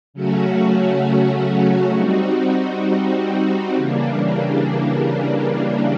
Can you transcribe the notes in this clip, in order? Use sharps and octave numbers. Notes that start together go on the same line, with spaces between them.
C#3 F#3 A3 C#4 F#4
G3 C4 D#4 F#4
C#3 E3 G3 A#3 D4